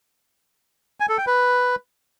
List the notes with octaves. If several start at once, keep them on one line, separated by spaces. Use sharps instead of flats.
G#5
A4
G5
B4